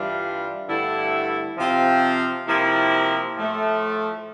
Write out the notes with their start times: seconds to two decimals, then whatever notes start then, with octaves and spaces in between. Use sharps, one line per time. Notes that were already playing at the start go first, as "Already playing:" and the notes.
Already playing: G2 E3 G3 D4 F4
0.67 G2 D3 A3 E4
1.56 C3 F3 C4 F4
2.46 C3 F3 A#3 E4
3.37 A2 F3 A3